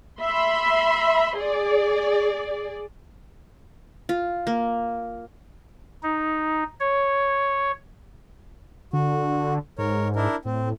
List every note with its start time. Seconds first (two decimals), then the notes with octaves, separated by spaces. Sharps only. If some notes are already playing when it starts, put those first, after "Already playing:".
0.20 E5 B5 C6
1.35 G#4 D5
4.09 F4
4.47 A#3
6.03 D#4
6.80 C#5
8.93 D3 F#4
9.78 G#2 A#4 C#5
10.16 D4 E4 A#4
10.45 A2 C4